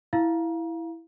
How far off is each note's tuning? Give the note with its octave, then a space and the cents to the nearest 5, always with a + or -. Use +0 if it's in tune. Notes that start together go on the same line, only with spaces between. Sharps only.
E4 +0 F5 +0 A#5 +25